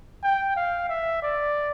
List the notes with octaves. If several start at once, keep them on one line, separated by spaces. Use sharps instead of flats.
G5
F5
E5
D5